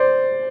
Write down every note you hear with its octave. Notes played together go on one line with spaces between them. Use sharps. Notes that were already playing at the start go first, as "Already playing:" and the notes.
Already playing: C5 D5